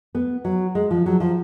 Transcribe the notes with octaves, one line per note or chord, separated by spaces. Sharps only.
B3
F#3
G#3
F3
F#3
F3